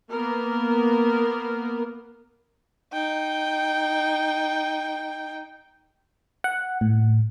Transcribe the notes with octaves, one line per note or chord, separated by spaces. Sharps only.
A#3 B3 A#4
D#4 G5
F#5
A2